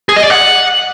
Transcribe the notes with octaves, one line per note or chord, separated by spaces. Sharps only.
G#4
D#5
D5
F#5